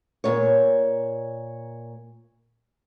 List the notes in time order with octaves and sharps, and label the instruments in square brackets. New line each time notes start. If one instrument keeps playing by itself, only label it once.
[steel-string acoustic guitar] A#2 C#5